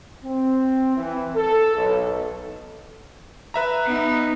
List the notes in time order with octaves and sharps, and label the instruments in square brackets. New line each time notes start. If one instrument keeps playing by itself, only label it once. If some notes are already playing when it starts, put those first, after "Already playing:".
[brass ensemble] C4
E3
A4
B1
[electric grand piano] B4 E5 A#5
[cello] B3 D#4